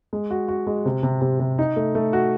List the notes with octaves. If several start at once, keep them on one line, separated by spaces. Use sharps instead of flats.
G#3
F#4
F#4
G#3
C3
C3
C3
C3
D#4
A3
A3
F#4